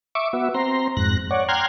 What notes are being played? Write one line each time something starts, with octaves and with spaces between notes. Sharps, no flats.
E5 C#6 D6
B3 F#4 E5
C4 A#5 C6
F2 G#2 F#6 A#6
C#5 D5 F#5
G5 A#5 C6 F6 F#6 G#6